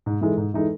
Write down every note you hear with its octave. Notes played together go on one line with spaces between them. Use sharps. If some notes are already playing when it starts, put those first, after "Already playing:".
G#2
E3 G#3 D#4 A4
G#2
E3 G#3 D#4 A4